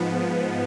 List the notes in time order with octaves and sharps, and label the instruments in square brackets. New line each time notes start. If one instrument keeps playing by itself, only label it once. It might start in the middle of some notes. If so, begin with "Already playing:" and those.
Already playing: [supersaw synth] G#2 F3 B3